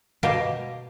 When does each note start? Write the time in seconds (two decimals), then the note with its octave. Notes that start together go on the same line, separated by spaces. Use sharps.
0.23 B2 A#3 G4 A#4 F5 A5